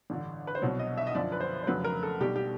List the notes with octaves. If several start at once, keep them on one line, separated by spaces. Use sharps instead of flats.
A1 G2 D3
B4
C5
C2 B2 F#3 C#5
D#5
E5
D#5
F#2 D3 F3 D5
B4
C5
C5
F1 F2 C#3 F#3 B4
A#4
A4
B1 B2 G3 G4
G4